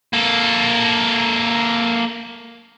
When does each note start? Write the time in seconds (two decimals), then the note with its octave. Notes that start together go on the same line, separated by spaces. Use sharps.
0.13 A#3 A4